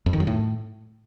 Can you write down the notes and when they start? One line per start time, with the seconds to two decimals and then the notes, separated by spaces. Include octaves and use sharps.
0.06 F2
0.13 D#3
0.20 F#2
0.27 A2